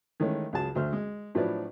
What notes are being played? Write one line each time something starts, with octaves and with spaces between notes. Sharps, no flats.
D#3 E3 G#3 A3 C#4
C#2 F#3 G#4 A5
D2 A3 C5 F6
G#3
A2 F3 F#3 D4 B4 D5